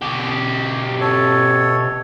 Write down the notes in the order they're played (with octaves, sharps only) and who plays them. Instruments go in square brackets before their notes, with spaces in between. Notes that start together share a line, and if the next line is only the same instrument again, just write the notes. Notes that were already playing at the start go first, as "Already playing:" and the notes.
[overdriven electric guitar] B2 G4
[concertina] A4 C#5